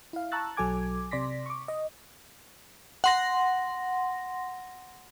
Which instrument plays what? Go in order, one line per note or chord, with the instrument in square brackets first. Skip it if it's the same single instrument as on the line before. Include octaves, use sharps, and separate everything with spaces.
[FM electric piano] E4 F5
A5 A#5 C#6 E6 F#6 A6
B1 F#3 A4 G#5 D6 G#6
C3 D5 C6 D6 A#6 B6
C#6 D6
D#5
[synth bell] F#5 C6 A#6